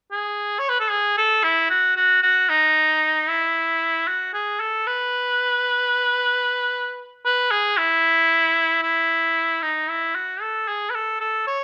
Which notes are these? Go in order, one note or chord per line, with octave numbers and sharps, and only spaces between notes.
G#4
C#5
B4
A4
G#4
A4
E4
F#4
F#4
F#4
D#4
E4
F#4
G#4
A4
B4
B4
G#4
E4
E4
D#4
E4
F#4
A4
G#4
B4
A4
A4
C#5